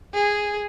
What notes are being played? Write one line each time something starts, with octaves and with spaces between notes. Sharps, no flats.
G#4